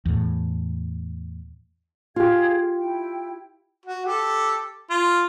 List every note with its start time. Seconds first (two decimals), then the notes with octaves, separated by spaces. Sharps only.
0.06 E2 A2
2.16 F4 G4 G#4 F5 G#6
2.78 E4 G5
3.86 F#4
4.06 G4 A4
4.90 F4